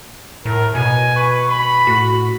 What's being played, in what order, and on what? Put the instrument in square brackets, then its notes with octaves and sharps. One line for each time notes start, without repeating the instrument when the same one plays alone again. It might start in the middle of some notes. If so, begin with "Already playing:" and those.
[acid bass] A2 [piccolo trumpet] A#4
[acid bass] B2 [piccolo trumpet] G#5
[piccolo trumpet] B4 [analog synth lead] C#6
[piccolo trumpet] B5
[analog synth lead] A2 [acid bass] F#4